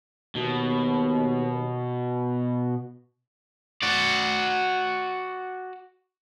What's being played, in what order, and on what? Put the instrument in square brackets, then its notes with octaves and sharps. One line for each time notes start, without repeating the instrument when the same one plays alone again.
[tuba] D#2 [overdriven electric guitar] B2
[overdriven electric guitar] F#4 D5